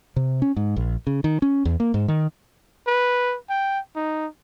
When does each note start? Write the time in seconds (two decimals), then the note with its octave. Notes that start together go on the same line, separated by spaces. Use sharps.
0.16 C3
0.42 C#4
0.56 G#2
0.76 A#1
1.07 C#3
1.24 D#3
1.42 C#4
1.65 E2
1.80 A#3
1.94 G#2
2.08 D#3
2.87 B4
3.50 G5
3.96 D#4